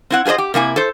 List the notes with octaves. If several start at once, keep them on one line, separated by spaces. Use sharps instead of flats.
C4 E4 F#5
F4 G#4 B4 C5 D#5
G4
C3 A#3 E4 G#5
A4 C5